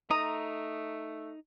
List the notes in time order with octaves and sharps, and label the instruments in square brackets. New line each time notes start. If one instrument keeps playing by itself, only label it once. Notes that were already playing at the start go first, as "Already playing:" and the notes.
[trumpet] A3 [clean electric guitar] D#4 [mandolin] A#5 D#6